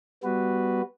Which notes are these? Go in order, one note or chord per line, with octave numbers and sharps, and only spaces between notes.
G3 B3 F#4 B4